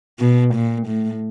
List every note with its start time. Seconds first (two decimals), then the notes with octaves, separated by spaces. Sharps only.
0.20 B2
0.54 A#2
0.87 A2